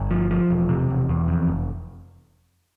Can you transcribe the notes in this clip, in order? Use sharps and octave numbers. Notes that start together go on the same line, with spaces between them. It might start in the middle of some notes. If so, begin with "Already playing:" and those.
Already playing: G1
F3
F3
E1
C3
E1
E2
F2
F1